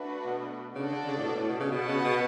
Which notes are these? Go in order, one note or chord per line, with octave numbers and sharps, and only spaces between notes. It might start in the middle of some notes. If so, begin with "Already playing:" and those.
Already playing: A3 D4 F#4 B4
B2
C#3 D4 F#4 A4 D5
D3
C#3
A2
B2
A2
B2
C#3
B2 B3 F#4 B4 F#5 A5
C#3
B2